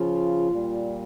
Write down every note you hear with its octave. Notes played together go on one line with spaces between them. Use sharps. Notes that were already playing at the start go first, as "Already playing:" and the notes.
Already playing: C#3 F3 F4
A#2 G3